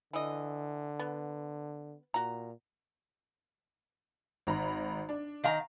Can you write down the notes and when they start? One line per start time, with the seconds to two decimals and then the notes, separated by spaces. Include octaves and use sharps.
0.13 D3 E3 D#5
0.99 B3
2.14 A#2 F#4 A#5
4.47 G#1 A#5 B5
5.09 D4
5.44 D#3 F5 A#5